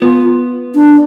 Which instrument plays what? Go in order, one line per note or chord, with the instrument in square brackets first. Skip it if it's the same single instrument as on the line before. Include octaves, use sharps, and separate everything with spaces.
[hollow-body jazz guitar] B3 [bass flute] F4
[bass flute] D4